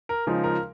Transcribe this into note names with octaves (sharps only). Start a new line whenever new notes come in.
A#4
C#3 F3 G#3 D#4 A#4
A#4